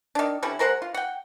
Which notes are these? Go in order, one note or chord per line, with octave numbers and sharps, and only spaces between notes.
D#3 D4
D3 G3 C#4 E4
G#3 A#4 C5 F#5
F4
F#5 G5